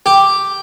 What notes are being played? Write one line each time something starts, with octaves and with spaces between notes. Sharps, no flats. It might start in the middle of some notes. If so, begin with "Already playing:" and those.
G4